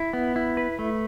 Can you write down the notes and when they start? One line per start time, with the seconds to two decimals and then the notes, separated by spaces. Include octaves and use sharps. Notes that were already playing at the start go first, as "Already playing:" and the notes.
Already playing: E4
0.13 B3
0.36 E4
0.57 B4
0.79 A3